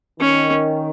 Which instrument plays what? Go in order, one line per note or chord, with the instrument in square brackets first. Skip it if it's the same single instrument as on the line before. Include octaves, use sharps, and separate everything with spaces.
[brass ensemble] D#3 [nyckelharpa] C#4